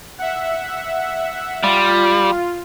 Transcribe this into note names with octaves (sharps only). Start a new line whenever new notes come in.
E5 F#5
G3 F4